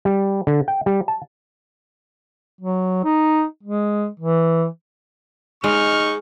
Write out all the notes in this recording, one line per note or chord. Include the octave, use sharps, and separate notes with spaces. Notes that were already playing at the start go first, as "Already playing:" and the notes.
G3
D3
G5
G3
A5
F#3
D#4
G#3
E3
G#3 D#4 C#6 F6